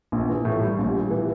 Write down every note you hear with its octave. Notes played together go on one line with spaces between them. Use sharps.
A#1
E3
A2
G3
A#1
G3
E3